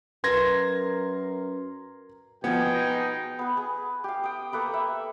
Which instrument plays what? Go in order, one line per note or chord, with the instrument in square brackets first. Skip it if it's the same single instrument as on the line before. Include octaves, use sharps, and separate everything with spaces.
[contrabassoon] F#2 [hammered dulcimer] A#4 [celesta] B4 [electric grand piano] C6 G#6 A#6
[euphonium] B2 [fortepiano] F3 B3 [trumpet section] G4 G#4 G5 [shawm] G#5
[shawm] D#4
[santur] B3 B4
G#4
G4 F5
G5 D#6
A#3 A4 B4 D#6
E5